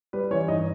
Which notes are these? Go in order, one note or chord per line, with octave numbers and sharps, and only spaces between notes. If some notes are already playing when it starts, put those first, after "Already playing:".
G3 B4
E3 C#4 C#5
G2 D#4 D#5